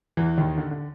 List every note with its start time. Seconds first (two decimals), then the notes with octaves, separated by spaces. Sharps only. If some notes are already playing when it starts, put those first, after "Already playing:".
0.17 E2 E3
0.38 D#2 D#3
0.58 D3
0.71 D3